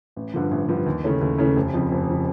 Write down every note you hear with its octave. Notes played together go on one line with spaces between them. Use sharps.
A1
G2 D3 F3
A1
G2 D3 F3
D#2
C#3 E3 A3 C#4
D#2
C#3 E3 A3 C#4
F1
F2 C#3 F3
F1
C#3 F3